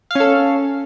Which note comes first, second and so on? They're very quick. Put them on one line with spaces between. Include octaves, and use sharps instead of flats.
F5 C#4 A4